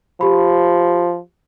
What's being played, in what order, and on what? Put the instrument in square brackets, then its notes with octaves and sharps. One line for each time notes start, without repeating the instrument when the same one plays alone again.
[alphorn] F3 [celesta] G4 B5